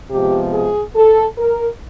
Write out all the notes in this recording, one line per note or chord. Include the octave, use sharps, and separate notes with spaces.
C3 F3 G#3 B3 G4
G#4
A4
A#4